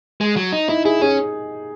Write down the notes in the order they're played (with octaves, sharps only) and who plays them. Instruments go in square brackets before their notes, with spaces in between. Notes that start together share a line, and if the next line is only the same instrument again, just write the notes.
[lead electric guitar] G#3
F#3
D#4
[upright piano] D#4 [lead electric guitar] E4
[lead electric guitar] E4 [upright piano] G#4
[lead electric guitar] C#4 [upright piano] G#4